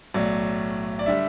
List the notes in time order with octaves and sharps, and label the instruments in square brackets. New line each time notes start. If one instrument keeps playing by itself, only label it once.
[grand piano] B1 A2 F#3 D5
D5
D3 G3 E5